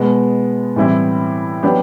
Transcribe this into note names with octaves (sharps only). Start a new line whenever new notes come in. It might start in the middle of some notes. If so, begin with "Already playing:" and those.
Already playing: B2 G#3 B3
A2 E3 G3 C4 E4
F#3 B3 D4 G4